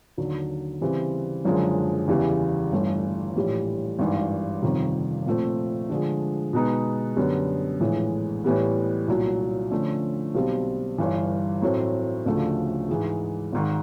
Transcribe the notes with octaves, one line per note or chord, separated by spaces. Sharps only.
D#2 D3 F#3
C#3 E3 G3 C4
F#1 F#2 D3 F3 G#3
E2 C#3 E3 G3
G1 G2 E3 A3
A#1 A2 E3 G3
G#1 G2 E3
G1 F2 C3 D#3
A#2 F3 A3 C4
D3 F3 G#3
B2 G#3 B3 D#4
F#2 D3 G3 B3
A#1 A2 E3 G#3
A2 E3 G3 B3
C2 A#2 F#3
D3 F3 A3 C#4 F4
B1 B2 G3 C4
G1 G2 E3
A2 F#3 A3 C4
D2 C#3 F3 A3 D4
G#2 E3 G#3
G#1 G#2 D#3